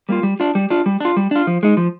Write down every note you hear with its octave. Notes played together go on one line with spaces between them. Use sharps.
G3 A#3 F4
G3
D4 F4
G3
D4 F4
G3
D4 F4
G3
D4 F4
F3
G#3 D#4
F3